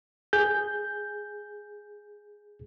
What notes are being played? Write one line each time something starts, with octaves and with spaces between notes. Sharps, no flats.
G#4 G6